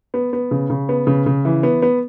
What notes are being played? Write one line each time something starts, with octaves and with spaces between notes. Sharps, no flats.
B3
B3
C#3
C#3
B3
C#3
C#3
E3
B3
B3